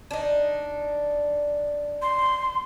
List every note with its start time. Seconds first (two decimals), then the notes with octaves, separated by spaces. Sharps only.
0.11 D4 D#4
2.02 C6